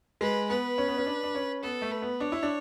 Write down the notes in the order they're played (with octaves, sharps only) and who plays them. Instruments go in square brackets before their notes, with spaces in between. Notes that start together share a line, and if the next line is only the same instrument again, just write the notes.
[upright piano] G#3 [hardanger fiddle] B4
[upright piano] B3 [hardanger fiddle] B4
[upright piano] C#4
B3
C#4
D4
D4
C#4
[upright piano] B3 [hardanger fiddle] A4
[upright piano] A3
[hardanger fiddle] B4
[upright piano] B3
[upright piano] D4 [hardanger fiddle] C#5
[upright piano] E4
D4